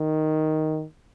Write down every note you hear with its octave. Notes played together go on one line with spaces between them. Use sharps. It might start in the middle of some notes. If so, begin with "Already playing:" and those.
Already playing: D#3